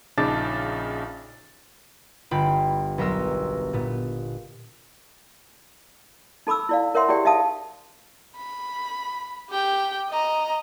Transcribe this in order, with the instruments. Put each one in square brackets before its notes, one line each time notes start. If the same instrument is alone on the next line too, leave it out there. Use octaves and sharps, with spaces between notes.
[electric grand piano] A#1 C#3 D#4 A5 D6 A6
[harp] G1 F4 G5 B5
B1 B3 A#4 C6 E6
A#2 B3
[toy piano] D#4 A4 B5 D6 E6
E4 D5 F5
A#4 C#5 E5 F#5 C6
E4 G4 G#4 D5 G5
D#4 E5 F5 A5 D#6
[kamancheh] B5
G4 G5
D#5 A#5